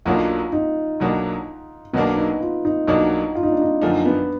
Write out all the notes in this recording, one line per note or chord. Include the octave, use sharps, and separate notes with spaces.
B1 B2 F#3 A#3 D4 F4
D#4
B1 B2 F#3 A#3 D4
B1 B2 F#3 A#3 B3 D4
D#4
F4
D#4
B1 B2 F#3 A#3 D4 D#4
F4
D#4
D4
D#4
F#2 D3 F3 A#3 D4 D#4
B3